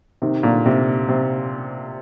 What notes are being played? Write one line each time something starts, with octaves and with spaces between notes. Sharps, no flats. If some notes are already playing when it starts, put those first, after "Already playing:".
C3 D#3
A#2 D3
C3
C3